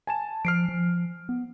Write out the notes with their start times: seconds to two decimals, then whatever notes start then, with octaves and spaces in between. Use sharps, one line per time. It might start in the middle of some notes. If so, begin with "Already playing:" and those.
0.07 G#5 A5 E7
0.45 F3 F6 C7 D7
0.69 F3
1.29 B3